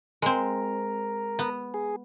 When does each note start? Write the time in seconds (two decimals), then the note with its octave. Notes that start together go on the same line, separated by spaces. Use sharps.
0.22 G#3 C4 A#4
1.39 B3
1.74 G#4